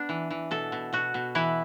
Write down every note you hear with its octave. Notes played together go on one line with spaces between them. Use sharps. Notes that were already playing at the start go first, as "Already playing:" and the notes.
Already playing: B3 D4
E3
E3
B2 A4
B2
B2 F#4
B2
E3 E4